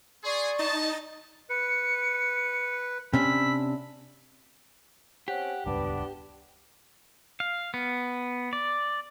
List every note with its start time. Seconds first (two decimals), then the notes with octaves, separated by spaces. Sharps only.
0.24 G#4 D5 C6 C#6
0.58 D#4 D#5 A5 A6
1.50 B4 C#7
3.13 C3 C#4 D4 B5 E6
5.28 C4 C#4 G4 F#5
5.66 D#1 C#2 G2 B3 D4
7.40 F5
7.74 B3
8.53 D5